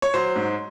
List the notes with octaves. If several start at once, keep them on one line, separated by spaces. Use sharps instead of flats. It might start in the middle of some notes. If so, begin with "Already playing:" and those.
C#5
F#3 C5
G#2